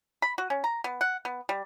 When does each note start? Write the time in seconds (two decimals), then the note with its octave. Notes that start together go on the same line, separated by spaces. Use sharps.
0.22 B5
0.38 F#4
0.50 C#4
0.64 A#5
0.84 B3
1.01 F#5
1.25 B3
1.49 G3